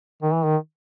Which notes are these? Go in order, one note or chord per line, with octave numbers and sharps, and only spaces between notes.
D#3
E3
D#3